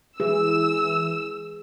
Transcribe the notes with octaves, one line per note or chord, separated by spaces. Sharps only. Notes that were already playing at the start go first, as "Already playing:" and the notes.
E3 G#4 E6